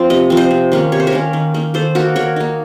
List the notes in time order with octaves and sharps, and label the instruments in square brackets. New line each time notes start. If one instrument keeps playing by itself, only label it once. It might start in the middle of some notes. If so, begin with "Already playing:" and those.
Already playing: [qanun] F3 C4
C3 D#5
F3 C4
C5 D#5
C3
D#3 A#3 C#4
C3 C#5
C5
A#4 C#5
D#3 A#3 C#4
D#3
A#3 D#4
D#3 A4 C5
A#3 D#4 F#4 A#4
D#3 A#4 C#5
A#3 D#4